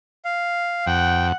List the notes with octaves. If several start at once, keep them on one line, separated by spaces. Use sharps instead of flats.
F5
F2 F#5 G5